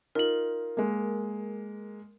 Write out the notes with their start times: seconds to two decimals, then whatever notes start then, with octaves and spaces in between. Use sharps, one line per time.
0.15 D#4 F4 A#4 F#7
0.77 G#3 A#3